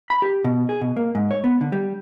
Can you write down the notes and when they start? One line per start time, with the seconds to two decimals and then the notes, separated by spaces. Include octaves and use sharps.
0.10 B5
0.22 G4
0.44 B2
0.69 G#4
0.81 B2
0.96 A#3
1.15 G#2
1.31 C#5
1.44 B3
1.61 D3
1.72 G3